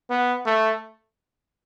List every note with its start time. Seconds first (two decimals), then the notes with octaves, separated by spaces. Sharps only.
0.10 B3
0.46 A3